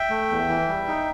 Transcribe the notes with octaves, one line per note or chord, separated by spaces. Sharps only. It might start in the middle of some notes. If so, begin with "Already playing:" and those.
Already playing: E5 G5
A3
E2
E3
G3
D#4